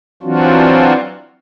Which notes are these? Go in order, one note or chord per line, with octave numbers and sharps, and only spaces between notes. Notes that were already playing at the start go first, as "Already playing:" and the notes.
E3 F#3 C4 D4 F4 F#4